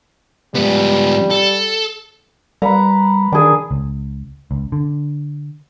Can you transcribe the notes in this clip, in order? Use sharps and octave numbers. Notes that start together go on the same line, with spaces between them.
G#2 G3 B3
A4
G3 B4 F#5 A#5
D#3 D4 G#4
C#2
C#2
D3